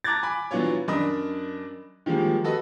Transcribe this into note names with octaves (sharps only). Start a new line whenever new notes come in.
A5 A#5 D6 F#6 G#6 A6
G#5 B5 D6
E3 F#3 B3 D4 F4 C#5
F#2 D4 A#4 D#5 B5 D#6
D#3 F3 G3 G#3 A#3
F#4 A4 B4 D#5